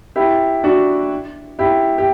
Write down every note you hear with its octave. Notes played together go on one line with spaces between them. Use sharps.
E4 G4
D4 F#4
E4 G4
G4